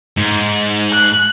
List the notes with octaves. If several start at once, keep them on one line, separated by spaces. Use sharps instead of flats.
G#2
F#6